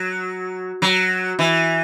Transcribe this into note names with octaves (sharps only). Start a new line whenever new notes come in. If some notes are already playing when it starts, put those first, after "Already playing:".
Already playing: F#3
F#3
E3